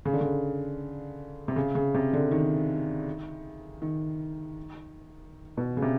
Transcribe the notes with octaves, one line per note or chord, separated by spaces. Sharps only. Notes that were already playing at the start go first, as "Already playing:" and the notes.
C#3
D3
C#3
C3
C#3
C#3
C3
D3
D#3
D#3
B2
C#3
C3